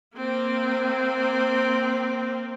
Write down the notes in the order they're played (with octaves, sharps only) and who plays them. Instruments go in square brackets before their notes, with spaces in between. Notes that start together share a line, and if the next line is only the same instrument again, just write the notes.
[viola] A#3 C4